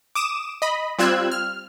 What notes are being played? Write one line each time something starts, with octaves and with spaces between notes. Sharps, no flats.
D6 D#6 E7
D#5 B5
G3 C4 F4 E6 F#6 G#6
F6